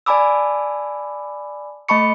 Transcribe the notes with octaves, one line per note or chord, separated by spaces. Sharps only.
D5 G#5 A5 B5 D6 E6
A3 D#5 A5 B5 C#6 C#7